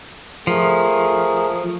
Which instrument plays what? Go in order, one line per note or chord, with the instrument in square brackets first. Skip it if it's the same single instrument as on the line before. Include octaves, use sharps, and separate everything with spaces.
[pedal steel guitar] F3 [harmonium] A3 G#4 A#4